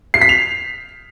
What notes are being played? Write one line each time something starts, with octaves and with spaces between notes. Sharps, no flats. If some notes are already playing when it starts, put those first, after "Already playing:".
C7
B6
F7